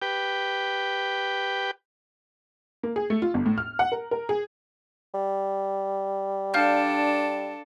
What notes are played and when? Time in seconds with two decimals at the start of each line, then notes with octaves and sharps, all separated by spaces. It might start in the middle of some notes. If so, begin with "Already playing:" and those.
0.02 G4 B4 G5
2.83 A#3
2.96 G#4
3.10 A3
3.22 F4
3.34 G1
3.46 A2
3.58 F6
3.79 F#5
3.92 A#4
4.11 A#4
4.29 G#4
5.14 G3
6.54 D4 A4 F5 F6 G6